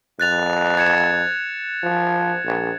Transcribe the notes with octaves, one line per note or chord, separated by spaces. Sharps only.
F2 F#6 A6 F7
G#6 C#7 E7
F3
A#1